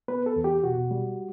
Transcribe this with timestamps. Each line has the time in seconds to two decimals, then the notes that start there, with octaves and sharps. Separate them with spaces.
0.08 B3 B4
0.26 A4
0.36 E2
0.44 G4
0.64 B2 F#4
0.91 G3